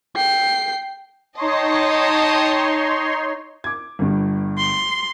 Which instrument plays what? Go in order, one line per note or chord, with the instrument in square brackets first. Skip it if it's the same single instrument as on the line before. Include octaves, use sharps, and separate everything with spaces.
[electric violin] G5 C7
[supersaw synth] D#4 C#5 C6 [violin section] D#5 G5 A5
[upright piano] D6 G#6
G1 G2
[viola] C6